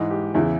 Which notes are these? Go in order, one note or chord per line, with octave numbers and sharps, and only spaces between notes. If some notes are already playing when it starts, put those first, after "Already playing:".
Already playing: G#2 E3 D#5
G4
E2 C#3 E3 E4